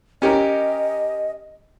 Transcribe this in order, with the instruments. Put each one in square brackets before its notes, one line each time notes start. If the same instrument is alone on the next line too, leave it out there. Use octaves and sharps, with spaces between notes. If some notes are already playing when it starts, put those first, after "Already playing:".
[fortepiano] C#4 G4 A#4 [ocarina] D#5